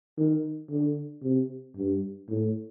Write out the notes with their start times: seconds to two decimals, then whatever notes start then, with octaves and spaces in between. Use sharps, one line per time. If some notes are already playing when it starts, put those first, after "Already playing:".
0.17 D#3
0.71 D3
1.23 C3
1.77 G2
2.29 A2